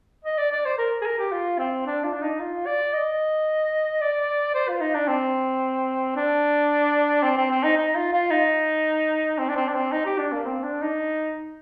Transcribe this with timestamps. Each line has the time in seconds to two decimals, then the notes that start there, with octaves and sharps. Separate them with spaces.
0.25 D#5
0.38 D5
0.52 D5
0.65 C5
0.78 A#4
1.02 G#4
1.06 A#4
1.18 G4
1.32 F4
1.59 C4
1.86 D4
2.04 F4
2.13 D4
2.22 D#4
2.40 F4
2.66 D5
2.93 D#5
4.01 D5
4.54 C5
4.68 F4
4.81 D#4
4.94 D4
5.08 C4
6.16 D4
7.23 C4
7.37 C4
7.50 C4
7.63 D#4
7.77 D#4
7.95 F4
8.13 F4
8.31 D#4
9.38 C4
9.49 D4
9.56 C4
9.68 D4
9.74 C4
9.92 D#4
10.05 G4
10.18 D4
10.33 A#3
10.46 C4
10.64 D4
10.82 D#4